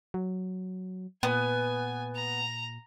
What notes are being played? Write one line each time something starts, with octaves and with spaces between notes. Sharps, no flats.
F#3
A#2 B3 G#5
A#5